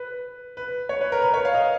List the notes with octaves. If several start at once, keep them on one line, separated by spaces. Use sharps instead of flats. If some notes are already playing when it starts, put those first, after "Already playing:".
Already playing: B4
B4
C#5
B4
A#4
B4
C#5
F5
D#5